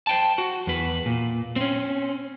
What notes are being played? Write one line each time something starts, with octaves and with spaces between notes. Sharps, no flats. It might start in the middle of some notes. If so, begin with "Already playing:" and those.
C5 G5 A5
F#4
E2 B4
A#2
C4 C#4